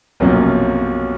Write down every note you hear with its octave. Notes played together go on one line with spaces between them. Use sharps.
B1 F#2 C3 F3 F#3 A#3